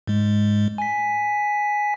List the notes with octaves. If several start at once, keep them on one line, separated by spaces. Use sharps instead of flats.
G#2 G#3
G#5 B6